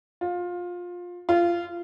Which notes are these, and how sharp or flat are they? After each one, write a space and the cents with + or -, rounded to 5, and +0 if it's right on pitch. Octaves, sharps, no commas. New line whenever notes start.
F4 +20
F4 -20